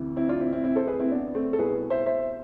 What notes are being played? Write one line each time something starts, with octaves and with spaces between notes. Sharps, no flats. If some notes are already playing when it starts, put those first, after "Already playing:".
Already playing: D2 C3 E3
C4 E4
D4 F4
C4 E4
C4 E4
C4 E4
A4 C5
G#4 B4
C4 E4
B3 D4
A3 C4
A4
C2 B2 G#4 B4
C5 E5
C5 E5